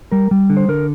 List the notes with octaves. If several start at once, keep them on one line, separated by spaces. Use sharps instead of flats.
G3 A#4
G3
D3
C5
D3 A#4